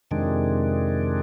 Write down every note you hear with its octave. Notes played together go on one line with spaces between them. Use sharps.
F2 C3 D#3 G#3 D4